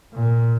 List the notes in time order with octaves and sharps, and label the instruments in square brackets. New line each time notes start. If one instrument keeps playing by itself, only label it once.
[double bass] A#2